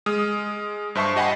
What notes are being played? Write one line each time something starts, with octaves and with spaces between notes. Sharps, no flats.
G#3 D#6 F6
G2 C5 E5 A5 C#6 C7
G4 D#5 F#5 G#5 A5 B5